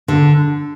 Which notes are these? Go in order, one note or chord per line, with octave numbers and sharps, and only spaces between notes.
D3